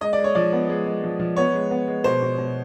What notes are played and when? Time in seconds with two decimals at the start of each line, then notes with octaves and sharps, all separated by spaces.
0.01 G#3 D#5
0.13 D5
0.18 G#3
0.24 C#5
0.35 F3 D5
0.53 B3
0.69 G#3
0.86 G#3
1.04 F3
1.20 F3
1.36 B3 C#5
1.54 G#3
1.71 B3
1.88 G#3
2.04 B2 C5
2.22 B2
2.38 B2